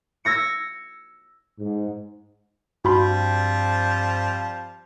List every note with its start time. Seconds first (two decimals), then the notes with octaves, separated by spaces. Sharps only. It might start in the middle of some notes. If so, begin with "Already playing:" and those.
0.25 E6 G#6 A#6 C#7
1.59 G#2
2.85 G2 F3 G3 C4 F#4 B5 C6